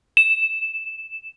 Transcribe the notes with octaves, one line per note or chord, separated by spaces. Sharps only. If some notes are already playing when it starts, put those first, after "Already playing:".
E7